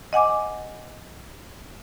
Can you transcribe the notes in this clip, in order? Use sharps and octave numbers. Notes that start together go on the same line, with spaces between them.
D#5 F#5 G#5 D6